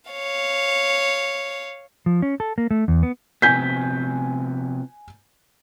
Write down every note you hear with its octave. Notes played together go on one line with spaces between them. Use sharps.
C#5 F5
F3
C#4
A4
A#3
A3
E2
B3
C3 F3 B3 G#5 G6 B6